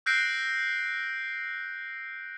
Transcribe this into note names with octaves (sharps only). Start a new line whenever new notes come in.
E6 F#6 G6 A#6 C7 D7